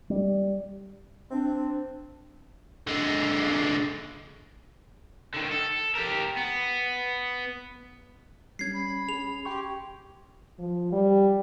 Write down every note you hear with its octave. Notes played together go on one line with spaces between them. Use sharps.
G3
C4 D4
D3 G#3
D3 D#3
A4
G4 A#4
B3
G3 C#4 G#6 C7
B5
C#4 G#4 F7
G4 G5 C6 C#6
F3
G3